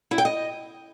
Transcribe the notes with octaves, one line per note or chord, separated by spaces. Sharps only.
E4
G5
D#5